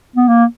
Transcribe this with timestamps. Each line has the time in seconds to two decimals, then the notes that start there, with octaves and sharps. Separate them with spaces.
0.16 B3
0.28 A#3